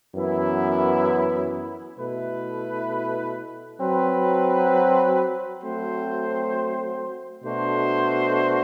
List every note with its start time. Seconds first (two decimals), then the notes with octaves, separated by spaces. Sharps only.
0.15 F#2 E3 B3 E4
1.97 B2 A3 E4 B4
3.79 F#3 C4 F#4 B4
5.61 F#3 A3 C4 F#4 C5
7.44 B2 A3 D4 F#4 C5